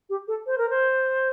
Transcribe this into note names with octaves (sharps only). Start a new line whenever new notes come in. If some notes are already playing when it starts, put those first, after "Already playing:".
G4
A4
C5
A#4
C5